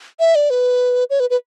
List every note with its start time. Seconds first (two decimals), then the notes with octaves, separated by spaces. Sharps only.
0.20 E5
0.35 D5
0.50 B4
1.10 C#5
1.20 B4
1.30 B4